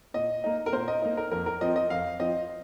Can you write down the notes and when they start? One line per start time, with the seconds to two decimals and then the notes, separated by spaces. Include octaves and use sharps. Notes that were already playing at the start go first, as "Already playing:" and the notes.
0.14 A#2 D#5
0.44 A#3 D#4
0.66 A#4
0.73 A#2 C5
0.88 D#5
1.02 A#3 D#4
1.17 A#4
1.31 F2 A#4
1.46 A#4
1.61 F3 C4 D#5
1.76 D#5
1.90 F2 F5
2.20 F3 C4 D#5